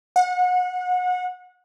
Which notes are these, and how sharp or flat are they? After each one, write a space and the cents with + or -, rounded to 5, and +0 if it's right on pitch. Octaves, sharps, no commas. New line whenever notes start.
F#5 -30